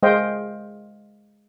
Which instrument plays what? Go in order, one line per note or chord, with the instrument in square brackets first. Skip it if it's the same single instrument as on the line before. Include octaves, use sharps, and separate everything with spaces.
[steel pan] G#3 C5 D#5 F5 G5